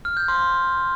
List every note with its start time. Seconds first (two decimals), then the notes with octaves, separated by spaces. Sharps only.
0.05 F6
0.17 G6
0.28 C6